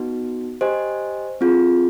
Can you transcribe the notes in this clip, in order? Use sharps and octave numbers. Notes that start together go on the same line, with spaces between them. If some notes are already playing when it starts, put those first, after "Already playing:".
Already playing: B3 D#4 F#4
G4 C5 D#5 G#5
C4 F4 G#4